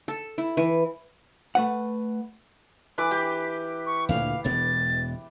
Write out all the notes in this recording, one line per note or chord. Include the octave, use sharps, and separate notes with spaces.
A4
E4
E3
A3 B4 F#5
E3 B4 D6
G4
C#6
D2 A#2 D3 F5
E1 B2 G#3 A6